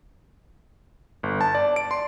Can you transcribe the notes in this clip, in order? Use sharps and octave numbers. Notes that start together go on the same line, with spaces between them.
G1
A5
D5
D7
C6